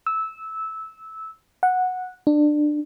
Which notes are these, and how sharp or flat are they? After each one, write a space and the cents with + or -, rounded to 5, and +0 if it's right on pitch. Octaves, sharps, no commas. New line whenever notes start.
E6 -15
F#5 -10
D4 +20